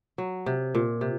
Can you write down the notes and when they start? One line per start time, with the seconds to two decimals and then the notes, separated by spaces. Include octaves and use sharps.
0.18 F#3
0.46 C3
0.75 A#2
1.01 C3